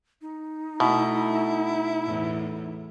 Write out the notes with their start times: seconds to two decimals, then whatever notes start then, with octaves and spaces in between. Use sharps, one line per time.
0.21 D#4
0.80 B2 A3 E4
2.05 E2 A2